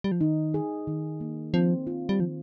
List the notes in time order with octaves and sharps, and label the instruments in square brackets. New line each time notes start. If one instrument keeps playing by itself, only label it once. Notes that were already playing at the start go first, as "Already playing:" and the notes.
[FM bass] G3
F3
[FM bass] D#3 [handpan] D#4
[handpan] G#4
D#3
A#3
[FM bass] F3 [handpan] C4
[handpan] F4
[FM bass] G3
[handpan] D#3 [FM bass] F3